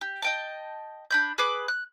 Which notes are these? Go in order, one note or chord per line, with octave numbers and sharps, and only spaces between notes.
G4
D#5 G5 A5
D4 B5 G6
G#4 B4 D6
F#6